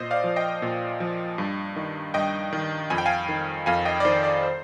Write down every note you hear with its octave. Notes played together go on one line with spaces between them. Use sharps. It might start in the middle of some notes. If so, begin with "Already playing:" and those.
Already playing: A#2 C5 D#5
D5 F5
F3
D#5 G5
A#2
F3
G2
D#3
G2 D#5 G5
D#3
F2 G#5
G5
F5 G#5
D#3
F2 F5 G#5
D#5 G5
D5
D#3 C5
D5
C5